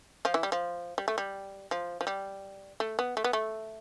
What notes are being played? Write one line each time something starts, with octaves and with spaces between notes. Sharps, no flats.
F3 F4
E3 E4
G3
F3
G3
A3
G3
F3
F3
G3
A3
B3
A3
B3
A3